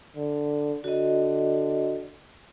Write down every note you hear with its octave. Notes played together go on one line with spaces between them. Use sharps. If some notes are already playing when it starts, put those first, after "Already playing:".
D3
D3 F#4 D#5